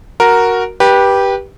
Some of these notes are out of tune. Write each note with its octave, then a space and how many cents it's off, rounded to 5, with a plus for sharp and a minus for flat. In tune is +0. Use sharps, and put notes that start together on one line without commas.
F#4 +0 A#4 +0
G4 +0 B4 -25